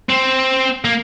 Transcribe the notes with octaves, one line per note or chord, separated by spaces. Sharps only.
C4
A#3